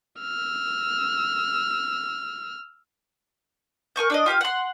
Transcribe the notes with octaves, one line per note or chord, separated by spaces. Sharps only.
E6 F6
A#4 G#5 C#6 G6
D4 D5 D#5
F4 G4 D#5 F5
F#5 C6